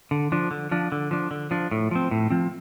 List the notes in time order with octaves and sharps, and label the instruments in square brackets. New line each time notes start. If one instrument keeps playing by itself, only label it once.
[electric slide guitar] D3
F3 D4
D3
F3 D4
D3
F3 D4
D3
F3 D4
A2
F3 C4
A2
F3 C4